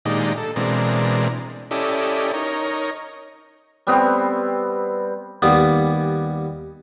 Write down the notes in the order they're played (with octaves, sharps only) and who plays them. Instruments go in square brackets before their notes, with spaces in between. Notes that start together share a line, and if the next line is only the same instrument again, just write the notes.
[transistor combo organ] A#2 D#3 G#3 D4 D#4 G4
A4
B2 E3 G#3 C4 D4 A#4
C#4 E4 G4 A4 D5 D#5
D#4 A#4 C#5
[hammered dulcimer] G3 B3 C4
[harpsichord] D#2 G3 B3